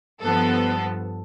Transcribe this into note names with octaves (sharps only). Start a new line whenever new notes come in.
G2 F3 B3 A4